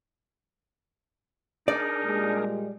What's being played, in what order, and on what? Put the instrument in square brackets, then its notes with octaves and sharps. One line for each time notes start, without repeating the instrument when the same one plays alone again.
[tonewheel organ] D4 G#4 A#4 [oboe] D#4 [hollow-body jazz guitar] D5
[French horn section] A#2 G3 G#3